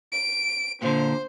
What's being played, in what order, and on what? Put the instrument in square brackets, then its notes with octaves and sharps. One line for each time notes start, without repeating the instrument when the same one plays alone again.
[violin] D7
[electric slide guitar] A#2 D3 [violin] C5